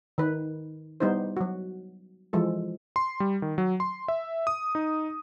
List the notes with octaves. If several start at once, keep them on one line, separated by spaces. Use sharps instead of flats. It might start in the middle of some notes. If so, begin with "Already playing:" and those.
D#3 B4
G3 B3 D#4 E4 C5
F#3 F#4
E3 F3 G#3 A4
C6
G3
D#3
F#3
C6
E5
D#6
D#4